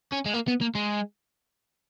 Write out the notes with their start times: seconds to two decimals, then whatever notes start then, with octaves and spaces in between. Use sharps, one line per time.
0.12 C#4
0.26 G#3
0.34 A#3
0.48 B3
0.61 A#3
0.75 G#3